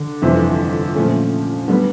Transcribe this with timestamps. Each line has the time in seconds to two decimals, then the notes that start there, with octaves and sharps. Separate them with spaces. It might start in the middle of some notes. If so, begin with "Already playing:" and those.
Already playing: D3
0.22 G1 F2 C3 E3
0.95 A#2 F3 A3 C#4
1.68 D3 G3 B3